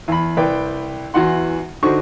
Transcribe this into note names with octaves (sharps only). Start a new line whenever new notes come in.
E2 B5
C2 B4 D5 G5
E2 E3 F#4 F#5 C6
D3 D#4 F#4 C5 C#6